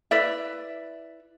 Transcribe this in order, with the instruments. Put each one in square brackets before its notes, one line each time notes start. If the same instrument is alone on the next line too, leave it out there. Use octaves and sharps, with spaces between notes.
[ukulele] E4 B4 D5 E5